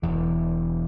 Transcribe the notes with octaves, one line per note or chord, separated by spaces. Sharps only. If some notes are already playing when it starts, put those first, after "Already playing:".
E1 E2 E3